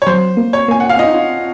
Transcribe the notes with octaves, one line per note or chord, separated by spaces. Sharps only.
C#5
F#3 C5
A#3
C#5
A#3 G#5
F#5
F5
F4 D#5
D#4
F4